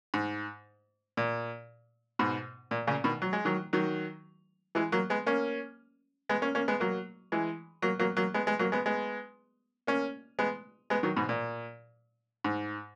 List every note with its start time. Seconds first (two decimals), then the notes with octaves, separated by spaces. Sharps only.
0.14 G#2
1.17 A#2
2.19 G#2 B2
2.71 A#2
2.87 A#2 C#3
3.04 B2 D#3
3.22 F#3
3.33 G#3
3.45 D#3 F#3
3.73 D#3 F#3
4.75 E3 G#3
4.92 F#3 A#3
5.10 G#3 B3
5.26 A#3 C#4
6.29 G#3 B3
6.42 A#3 C#4
6.55 A#3 C#4
6.68 G#3 B3
6.80 F#3 A#3
7.32 E3 G#3
7.82 F#3 A#3
7.99 F#3 A#3
8.17 F#3 A#3
8.34 G#3 B3
8.46 G#3 B3
8.59 F#3 A#3
8.72 G#3 B3
8.86 G#3 B3
9.87 A#3 C#4
10.39 G#3 B3
10.90 G#3 B3
11.03 D#3 F#3
11.17 G#2 B2
11.29 A#2
12.44 G#2